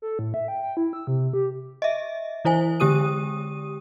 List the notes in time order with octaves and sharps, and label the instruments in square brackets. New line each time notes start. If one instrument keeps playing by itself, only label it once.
[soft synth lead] A4
A2
E5
G5
G5
E4
E6
C3
G4
[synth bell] D#5 E5
E3 E4 C5 G#5
D3 G#3 G4 D#6 D#7